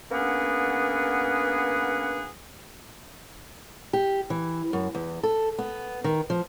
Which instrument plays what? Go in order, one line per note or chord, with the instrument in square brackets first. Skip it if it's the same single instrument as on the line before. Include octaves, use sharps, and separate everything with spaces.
[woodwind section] A#3 B3 C#4 D4 G#4 F#5
[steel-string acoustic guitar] G4
E3
F#2
E2
A4
B3
D#3
F3